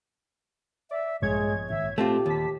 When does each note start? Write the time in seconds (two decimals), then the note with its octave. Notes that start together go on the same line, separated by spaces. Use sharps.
0.91 D5 E5
1.22 A#1 G2 F3 G#3 B3 C#5 G#6
1.70 G#1 G#2 E5
1.98 A#2 A3 C4 F4 G4 A5
2.26 D#2 A5 B6